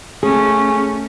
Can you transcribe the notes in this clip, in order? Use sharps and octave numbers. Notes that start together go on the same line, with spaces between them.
A3 C#4 G#4